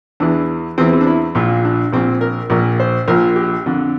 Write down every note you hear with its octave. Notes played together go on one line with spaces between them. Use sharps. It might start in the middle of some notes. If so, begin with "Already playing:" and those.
E2 E3 D4
E2 E3 C4
C4
D4
E4
A#1 A#2 F4
D4
A#1 A#2 C4
A#4
A#1 A#2 A#4
C5
A#1 A#2 A#4
G4
F2 D3